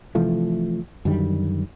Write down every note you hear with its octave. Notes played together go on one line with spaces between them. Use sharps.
C3 E3 F3 A3
F#2 D3 D#3 G3